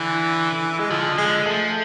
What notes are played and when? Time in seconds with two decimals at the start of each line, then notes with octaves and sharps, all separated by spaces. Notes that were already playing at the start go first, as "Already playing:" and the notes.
Already playing: D3 E3
0.79 G#3
0.91 D3 F3
1.18 D3 G#3
1.46 F3 A3